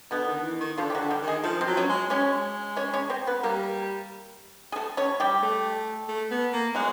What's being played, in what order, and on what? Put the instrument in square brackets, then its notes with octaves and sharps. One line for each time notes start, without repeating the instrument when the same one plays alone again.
[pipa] B2 B3 [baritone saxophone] D3
[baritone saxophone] D#3
E3
D#3
[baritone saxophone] D3 [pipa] F3 F4
[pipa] G4
F#3 F#4
[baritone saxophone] D3
[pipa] G3 G4
[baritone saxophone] D#3
[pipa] G#3 G#4
[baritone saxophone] F3 [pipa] A3 A4
[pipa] C4 C5
[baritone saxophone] F#3
[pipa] C#4 C#5
[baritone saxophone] G#3
[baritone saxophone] G#3 [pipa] C#4 C#5
[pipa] C#4 C#5
C#4 C#5
C4 C5
B3 B4
[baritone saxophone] G3 [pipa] A#3 A#4
[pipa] G#4
A3 A4
C#4 C#5
G3 G4
[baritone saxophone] A3
A3
B3
A#3
[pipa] F#3 F#4 [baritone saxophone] G#3